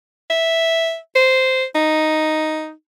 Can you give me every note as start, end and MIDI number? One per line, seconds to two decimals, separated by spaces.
0.30 0.97 76
1.16 1.64 72
1.75 2.72 63